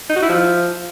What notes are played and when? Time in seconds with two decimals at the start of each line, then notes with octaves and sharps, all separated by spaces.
0.09 D#4
0.16 F#4
0.23 E4
0.29 F3